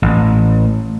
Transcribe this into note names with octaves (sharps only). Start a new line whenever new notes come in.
A1